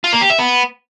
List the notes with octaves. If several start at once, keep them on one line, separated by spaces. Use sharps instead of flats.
F4
A#3
G4
E5
B3